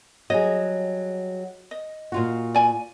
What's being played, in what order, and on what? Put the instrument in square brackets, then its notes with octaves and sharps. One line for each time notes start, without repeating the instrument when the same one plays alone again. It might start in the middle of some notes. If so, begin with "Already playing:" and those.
[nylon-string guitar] F#3 G3 G#4 [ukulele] D#5
[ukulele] D#5
[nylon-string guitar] A#2 F4 F#4
[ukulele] D5 G#5